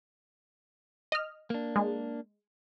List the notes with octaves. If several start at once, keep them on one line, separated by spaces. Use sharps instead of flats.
D#5 F6
A#3 D4
G#3